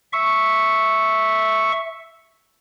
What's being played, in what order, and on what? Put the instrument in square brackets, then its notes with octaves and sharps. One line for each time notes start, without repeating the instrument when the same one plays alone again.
[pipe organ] E5 C#6